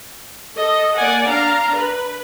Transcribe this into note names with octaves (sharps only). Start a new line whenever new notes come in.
A4 D#5
A#3 D5 F#5 G#5
D4 F5 A#5
B4